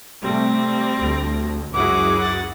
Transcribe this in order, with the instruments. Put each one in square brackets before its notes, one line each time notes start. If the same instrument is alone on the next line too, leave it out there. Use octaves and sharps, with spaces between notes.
[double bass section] C3 A3 [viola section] G3 [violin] C4 A#6
[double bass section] D2
[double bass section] C#2 F#2 [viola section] E4 F#4 G#4 [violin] F#5 [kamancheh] D6
[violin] F#5 A6